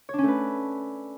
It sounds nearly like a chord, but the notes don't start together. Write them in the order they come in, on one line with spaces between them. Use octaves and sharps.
C#5 D4 C#4 A3 B4